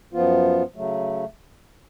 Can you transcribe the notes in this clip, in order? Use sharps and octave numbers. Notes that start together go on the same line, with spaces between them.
F#2 F3 B3 F4
C#3 F#3 A3